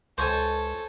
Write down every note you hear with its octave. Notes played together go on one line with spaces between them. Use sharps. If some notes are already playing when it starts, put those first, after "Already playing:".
C#2 A4 C5 C#5 G#5